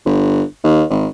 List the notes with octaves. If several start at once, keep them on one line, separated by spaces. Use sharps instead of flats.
G1
D#2
G#1